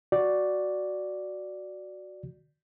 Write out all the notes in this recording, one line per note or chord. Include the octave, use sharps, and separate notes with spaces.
F#4 D5